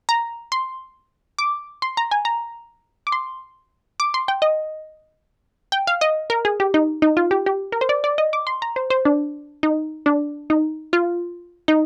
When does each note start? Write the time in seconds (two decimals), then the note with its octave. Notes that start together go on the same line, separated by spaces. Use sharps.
0.09 A#5
0.52 C6
1.38 D6
1.82 C6
1.97 A#5
2.11 G#5
2.25 A#5
3.07 D6
3.12 C6
4.00 D6
4.14 C6
4.28 G5
4.42 D#5
5.72 G5
5.87 F5
6.01 D#5
6.30 A#4
6.45 G#4
6.60 G4
6.74 D#4
7.02 D#4
7.17 F4
7.31 G4
7.46 G4
7.72 A#4
7.81 C5
7.89 D5
8.04 D5
8.18 D#5
8.33 D6
8.47 C6
8.62 A#5
8.76 C5
8.90 C5
9.05 D4
9.63 D#4
10.06 D4
10.50 D#4
10.93 F4
11.68 D#4